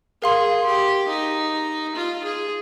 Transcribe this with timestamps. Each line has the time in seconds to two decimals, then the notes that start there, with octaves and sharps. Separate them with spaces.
0.22 G#4 A#4 F5 C6
0.66 G4
1.08 D#4
1.95 F4
2.24 G#4